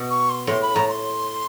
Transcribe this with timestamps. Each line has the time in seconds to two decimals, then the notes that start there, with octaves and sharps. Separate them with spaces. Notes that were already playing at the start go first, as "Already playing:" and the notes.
Already playing: B2
0.10 C#6
0.30 C6
0.47 A2 C6
0.62 B5
0.75 A2 A#5
0.89 C6